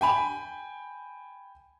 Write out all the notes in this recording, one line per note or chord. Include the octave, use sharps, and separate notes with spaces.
G5 G#5 B5